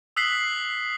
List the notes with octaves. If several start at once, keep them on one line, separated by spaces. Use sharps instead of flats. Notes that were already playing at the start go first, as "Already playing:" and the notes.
D#6 E6 F#6 B6 C7 F#7